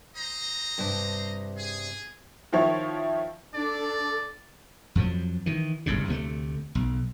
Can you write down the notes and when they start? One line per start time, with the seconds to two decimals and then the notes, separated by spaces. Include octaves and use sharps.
0.16 C5 D#5 A#5
0.78 G2 C3 A5
1.57 G#4
2.53 D#3 F3 E4 C#5
3.54 D4 A4 D5
4.95 F2 F3 F#3
5.46 D#3 E3
5.86 F#1 C2 G#2 C#3
6.08 D2 C3 G3 A3
6.75 B1